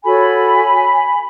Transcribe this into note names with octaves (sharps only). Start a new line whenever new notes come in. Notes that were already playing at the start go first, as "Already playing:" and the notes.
F#4 A4 C#5 G#5 B5